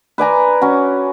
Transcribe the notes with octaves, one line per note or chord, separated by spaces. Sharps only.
B4 D5 G#5 A#5
C#4 F#4